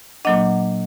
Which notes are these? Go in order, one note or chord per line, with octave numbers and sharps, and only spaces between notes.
A#2 F#3 A#3 D4 D#5 F#5